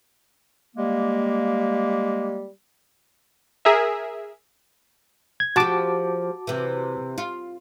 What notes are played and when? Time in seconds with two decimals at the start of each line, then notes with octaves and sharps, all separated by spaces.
0.75 G3 G#3 A#3
3.65 G#4 A#4 E5
5.40 G#6
5.56 F3 F#4 G4 A5 D6
6.47 C3 E3
7.18 F4